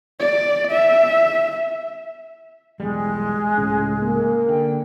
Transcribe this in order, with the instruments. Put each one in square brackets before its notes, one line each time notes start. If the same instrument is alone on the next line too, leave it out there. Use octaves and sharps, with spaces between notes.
[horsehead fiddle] D5
E5
[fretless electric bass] B1 E2 G3 [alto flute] G#3
[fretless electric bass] C#2 A2 [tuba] C#3
[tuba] A#3
[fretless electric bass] D3 [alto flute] G5